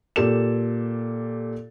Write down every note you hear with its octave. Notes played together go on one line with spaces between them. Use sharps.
A#2 G4 A4 E7